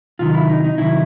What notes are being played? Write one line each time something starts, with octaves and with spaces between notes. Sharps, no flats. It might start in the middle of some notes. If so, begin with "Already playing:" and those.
C3 D#3 F#3 F4
E4
D#4
D#4
C3 D#3 F#3 E4